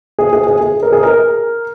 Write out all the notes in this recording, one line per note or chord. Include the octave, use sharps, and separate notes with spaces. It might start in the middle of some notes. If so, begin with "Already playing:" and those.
G#4
G#4
G#4
G#4
A#4
G#4
A#4